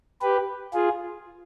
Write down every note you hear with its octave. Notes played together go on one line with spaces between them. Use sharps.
G4 B4
F4 G#4